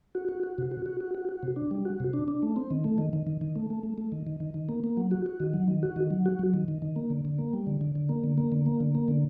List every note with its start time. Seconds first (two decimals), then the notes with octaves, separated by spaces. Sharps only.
0.15 F#4
0.29 F#4
0.43 F#4
0.58 C3
0.71 F#4
0.86 F#4
1.00 F#4
1.15 F#4
1.29 F#4
1.43 C3
1.56 D4
1.71 G3
1.85 F#4
2.00 C3
2.13 D4
2.28 D4
2.43 A3
2.56 C4
2.71 D#3
2.84 A3
2.98 D#3
3.13 D#3
3.27 D#3
3.41 D#3
3.56 A3
3.70 A3
3.83 A3
3.98 A3
4.12 D#3
4.27 D#3
4.40 D#3
4.54 D#3
4.69 A#3
4.84 A#3
4.97 F#3
5.11 F#4
5.26 F#4
5.40 D#3
5.53 F#3
5.68 D#3
5.83 F#4
5.96 D#3
6.10 F#3
6.26 F#4
6.39 F#3
6.54 D#3
6.68 D#3
6.82 D#3
6.96 A#3
7.10 D3
7.25 D3
7.38 A#3
7.53 G3
7.67 D3
7.81 D3
7.95 D3
8.09 A#3
8.24 D3
8.38 A#3
8.52 D3
8.66 A#3
8.80 D3
8.95 A#3
9.08 D3